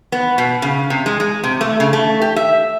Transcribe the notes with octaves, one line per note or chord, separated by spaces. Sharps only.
B3
B2
C#3
C3
G#3
G#3
C3
A3
C#3
A3
G4
E5